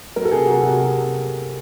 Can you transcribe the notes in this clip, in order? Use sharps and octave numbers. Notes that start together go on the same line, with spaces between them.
F#3 A#4
A4
C3 G#4
C3 F#4
C3 F#4